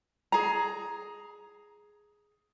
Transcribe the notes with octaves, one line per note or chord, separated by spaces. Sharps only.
G#4 A#5